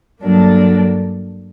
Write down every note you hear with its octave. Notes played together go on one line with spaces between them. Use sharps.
G2 F#3 A#3 D4 A4